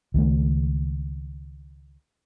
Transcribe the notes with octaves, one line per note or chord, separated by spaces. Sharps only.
C#2 D#3 A3